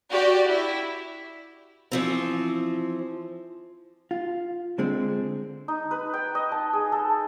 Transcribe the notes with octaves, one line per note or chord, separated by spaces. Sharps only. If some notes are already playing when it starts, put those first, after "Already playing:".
F#4 G4 D5
E4
E3 F3 C4
F4
D3 G#3 C4
D#4
B4
G5
D#5
A5
G#4
A4